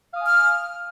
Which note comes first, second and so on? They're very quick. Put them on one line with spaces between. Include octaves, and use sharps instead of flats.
F5 D#6 G#5 F6